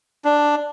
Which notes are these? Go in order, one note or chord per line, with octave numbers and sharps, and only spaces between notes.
D4